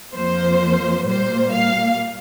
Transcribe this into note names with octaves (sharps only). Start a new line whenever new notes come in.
F2 F3 A#3 C5
A#2 G3 A#3 C5
F5